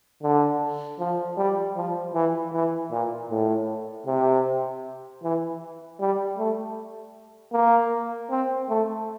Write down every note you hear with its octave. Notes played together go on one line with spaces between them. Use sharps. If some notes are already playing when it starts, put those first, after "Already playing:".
D3
F3
G3
F3
E3
E3
A#2
A2
C3
E3
G3
A3
A#3
C4
A3